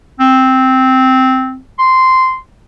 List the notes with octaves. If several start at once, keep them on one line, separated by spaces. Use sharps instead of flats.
C4
C6